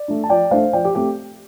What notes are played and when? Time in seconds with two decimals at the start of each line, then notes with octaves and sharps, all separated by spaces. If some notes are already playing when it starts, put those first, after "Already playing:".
Already playing: D5
0.08 A3 D4
0.24 A5
0.29 F3 D5 G5
0.51 A3 D4 C5 F5
0.73 F3 D5 G5
0.85 G4
0.95 A3 C4 G4